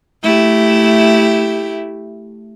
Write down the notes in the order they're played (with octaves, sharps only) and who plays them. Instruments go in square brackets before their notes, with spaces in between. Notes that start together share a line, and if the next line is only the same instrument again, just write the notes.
[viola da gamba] A3 E4 G4